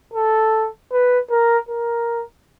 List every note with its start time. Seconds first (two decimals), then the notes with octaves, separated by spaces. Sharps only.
0.14 A4
0.92 B4
1.31 A#4
1.69 A#4